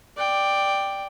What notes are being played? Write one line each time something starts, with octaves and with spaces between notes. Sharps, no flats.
D5 G5